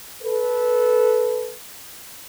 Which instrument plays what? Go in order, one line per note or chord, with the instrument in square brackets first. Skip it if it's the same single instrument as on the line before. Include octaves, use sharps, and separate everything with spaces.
[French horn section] A4 B4